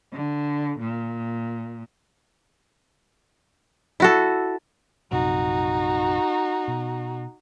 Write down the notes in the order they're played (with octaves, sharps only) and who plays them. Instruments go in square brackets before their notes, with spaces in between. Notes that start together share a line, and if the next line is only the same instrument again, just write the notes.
[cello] D3
A#2
[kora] E4 F#4 A4
[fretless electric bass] A#1 F#2 C3 [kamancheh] D#4 F#4
[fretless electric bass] B2